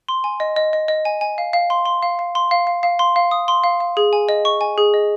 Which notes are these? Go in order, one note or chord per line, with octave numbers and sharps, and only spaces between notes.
C6
G#5
D#5
D#5
D#5
D#5
G#5
G#5
F5
F5
C6
C6
F5
F5
C6
F5
F5
F5
C6
F5
D#6
C6
F5
F5
G#4
G#5
D#5
C#6
G#5
G#4
D#5